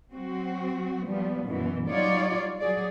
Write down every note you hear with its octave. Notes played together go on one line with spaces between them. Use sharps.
F#3 C4 F#4
F3 G3 B3
F#2 B2 E3
F#3 G3 D#4 F4 C#5 D5
F#3 G#4 D5